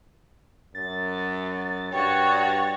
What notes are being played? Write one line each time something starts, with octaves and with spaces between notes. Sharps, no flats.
F#2 A6
G2 F#4 C#5 G5